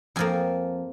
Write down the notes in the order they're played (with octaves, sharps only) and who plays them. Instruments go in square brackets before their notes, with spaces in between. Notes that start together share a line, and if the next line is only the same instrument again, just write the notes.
[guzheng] F2 F3 A#3 G#5